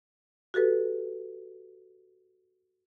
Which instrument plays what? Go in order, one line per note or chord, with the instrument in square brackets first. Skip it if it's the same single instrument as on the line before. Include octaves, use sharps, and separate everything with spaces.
[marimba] F#4 G4 A4 B4